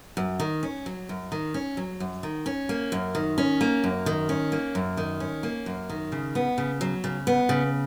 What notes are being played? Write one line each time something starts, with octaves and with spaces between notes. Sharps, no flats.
F#2
D#3
C#4
F#3
F#2
D#3
C#4
F#3
F#2
D#3
C#4
A#3
F#2
D#3
C#4
A#3
F#2
D#3
C#4
A#3
F#2
D#3
C#4
A#3
F#2
D#3
C#3
B3
C#3
F#3
C#3
B3
C#3